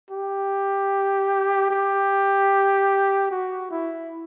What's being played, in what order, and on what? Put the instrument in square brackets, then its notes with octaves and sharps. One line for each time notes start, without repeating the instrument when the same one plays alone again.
[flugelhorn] G4
G4
F#4
E4